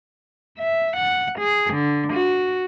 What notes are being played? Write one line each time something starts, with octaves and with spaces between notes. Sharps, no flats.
E5
F#5
G#4
D3
F#4